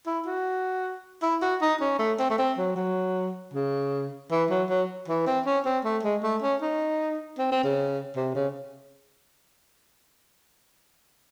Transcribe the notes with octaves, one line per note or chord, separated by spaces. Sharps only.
E4
F#4
E4
F#4
D#4
C#4
A3
C4
A3
C4
F#3
F#3
C#3
E3
F#3
F#3
E3
C4
C#4
C4
A3
G#3
A3
C#4
D#4
C4
C4
C#3
C3
C#3